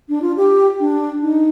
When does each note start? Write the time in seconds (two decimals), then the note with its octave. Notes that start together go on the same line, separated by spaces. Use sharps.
0.09 D4
0.22 F4
0.37 G4
0.80 D4
1.23 D#4